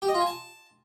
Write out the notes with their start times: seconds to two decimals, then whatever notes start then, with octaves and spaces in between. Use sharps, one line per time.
0.02 G4
0.08 D#5
0.14 F4
0.20 G#5
0.26 A5